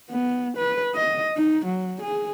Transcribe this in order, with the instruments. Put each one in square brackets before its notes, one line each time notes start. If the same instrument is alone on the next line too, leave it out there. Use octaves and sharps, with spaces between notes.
[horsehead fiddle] B3
B4
D#5
D#4
F#3
G#4